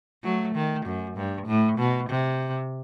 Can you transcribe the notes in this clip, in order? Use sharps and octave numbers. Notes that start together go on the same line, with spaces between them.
F#3 A3
D#3
F#2
G2
A2
B2
C3